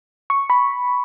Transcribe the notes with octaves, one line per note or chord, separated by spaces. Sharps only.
C#6
B5